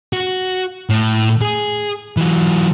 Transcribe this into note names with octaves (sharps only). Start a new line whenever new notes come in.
F#4
A2
G#4
E3 F#3